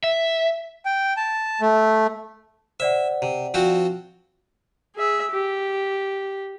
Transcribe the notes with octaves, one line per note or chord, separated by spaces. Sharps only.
E5
G5
A5
A3
C5 D5 E5 F#5
C3
F3 C4 F#4
G#4 E5
G4